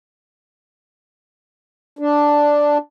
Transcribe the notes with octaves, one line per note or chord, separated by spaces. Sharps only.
D4